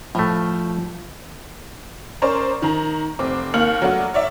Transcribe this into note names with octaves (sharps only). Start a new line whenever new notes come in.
A2 F3 A3
C#4 A#4 C5 D5 A#5 C#6
D#3 A#5
F1 C4 D6
D#2 A#3 F6 C#7 F#7
F#3 A3 B3 D4 F#4
C#5 D5 E5